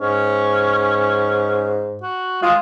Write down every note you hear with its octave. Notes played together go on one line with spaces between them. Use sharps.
G#2 C#4
F#4
G#3 F4